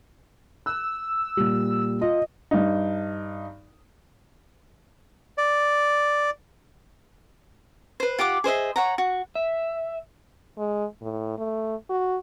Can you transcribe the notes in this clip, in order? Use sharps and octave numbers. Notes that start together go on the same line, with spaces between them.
E6 F#6
A#2 G3
F4 D#5
G2 D#4
D5
B4 C5
F4 G4 F#5 D6
G#4 C5 D#5 E5
C#5 F#5 A#5
F#4
E5
G#3
A2
A3
F#4